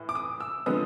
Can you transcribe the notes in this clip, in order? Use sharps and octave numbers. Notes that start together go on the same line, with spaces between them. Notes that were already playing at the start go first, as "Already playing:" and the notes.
Already playing: A2 E3
D6
D#6
E6
D3 F3 G#3 B3 D#6